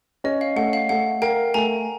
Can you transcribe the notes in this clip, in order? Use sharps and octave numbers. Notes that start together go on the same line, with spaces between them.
C#4 D#5
F5
A3 F#5
F5
A3 F#5
A#4 F5 G5
A3 G#5 A#5